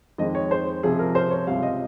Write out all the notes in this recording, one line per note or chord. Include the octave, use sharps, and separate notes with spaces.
F2 D#3 G#3 D#5
C#5
C5
C#2 C3 F3 G#4
A#4
C5
C#5
C#2 C3 G3 F5
D#5